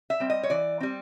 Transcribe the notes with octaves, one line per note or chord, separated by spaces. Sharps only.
E5
G3 C4
D#5
C#5
E3 D5
G3 C4